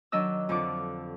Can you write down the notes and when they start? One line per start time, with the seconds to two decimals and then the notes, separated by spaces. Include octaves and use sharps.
0.12 D#3 F#3 D4 D#5 E6
0.49 F2 D3 D4 D6